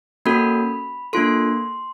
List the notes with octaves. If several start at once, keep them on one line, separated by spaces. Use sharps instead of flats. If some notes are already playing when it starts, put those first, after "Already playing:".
A#3 C#4 F#4 A4 B5
A#3 D4 F4 A4 C6